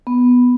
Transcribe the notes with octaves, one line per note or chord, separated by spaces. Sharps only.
B3